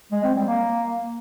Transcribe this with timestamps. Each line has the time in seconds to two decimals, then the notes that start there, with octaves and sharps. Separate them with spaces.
0.12 G#3
0.24 C4
0.35 G3
0.47 A#3